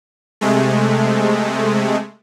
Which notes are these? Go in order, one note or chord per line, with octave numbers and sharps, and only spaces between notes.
C3 G#3 A3